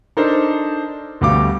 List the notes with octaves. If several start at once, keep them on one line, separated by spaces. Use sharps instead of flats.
D4 D#4 A4 A#4 C5
D2 B2 G3 G4 F5 D6